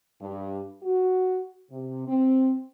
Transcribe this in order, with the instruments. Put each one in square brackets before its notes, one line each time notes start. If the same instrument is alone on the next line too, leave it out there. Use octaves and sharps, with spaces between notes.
[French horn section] G2
F#4
C3
C4